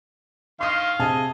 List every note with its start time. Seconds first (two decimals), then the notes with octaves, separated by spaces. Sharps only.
0.61 D#3 D#4 F5 C6 C#6 D#6
0.99 C3 G#4 D#5 G#5 A5